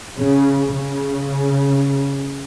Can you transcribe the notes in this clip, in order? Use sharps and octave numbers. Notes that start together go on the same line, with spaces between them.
C#3
C#3